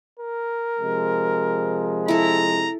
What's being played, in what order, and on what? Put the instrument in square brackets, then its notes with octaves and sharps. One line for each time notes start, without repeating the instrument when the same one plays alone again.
[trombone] A#4
[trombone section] C3 F3 G#3
[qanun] E4 A4 [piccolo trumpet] A#5